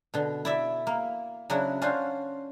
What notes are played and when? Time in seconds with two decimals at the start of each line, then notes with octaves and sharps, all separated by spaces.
0.14 B2 D3
0.45 E4 D5 E5
0.87 A#3
1.50 C#3 F#3 D4 E4 F#5
1.82 C#4 D4 F4 F#4 C5